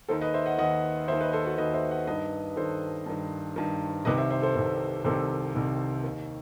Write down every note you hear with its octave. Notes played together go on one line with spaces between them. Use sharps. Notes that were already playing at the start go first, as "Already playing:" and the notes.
D#2 D#3 A4 C5
B4 D#5
C5 E5
D#5 F#5
D#2 D#3 D#5 F#5
D#2 D#3 C5 E5
B4 D#5
A4 C5
F#4 A4
D#2 D#3 B4 D#5
C5 E5
D#5 F#5
G2 D#3 B4 D#5
G2 D#3 A4 C5
G2 D#3
G2 D#3
C2 C3 D#3 B4 D#5
C5 E5
C5 E5
A4 C5
C2 C3 D#3
C2 C3 D#3 A4 C5
C2 C3 D#3
D#2 D#3